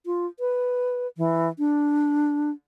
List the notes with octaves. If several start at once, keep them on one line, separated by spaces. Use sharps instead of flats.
F4
B4
E3
D4